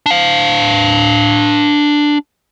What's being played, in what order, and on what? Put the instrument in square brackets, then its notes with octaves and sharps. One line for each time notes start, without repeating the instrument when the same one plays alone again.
[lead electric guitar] D4 F5